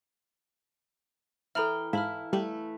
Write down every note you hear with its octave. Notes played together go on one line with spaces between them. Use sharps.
E3 A4 E5 G5 A#5 B5 F6
G#2 E4 F5 A5 B5 F6
G3 A3 B4